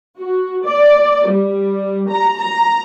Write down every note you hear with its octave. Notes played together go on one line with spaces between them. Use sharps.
F#4
D5
G3
A#5
A#5